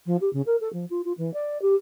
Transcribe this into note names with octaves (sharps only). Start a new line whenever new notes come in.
F3
G4
C#3
A#4
A4
F3
F4
F4
E3
D5
G4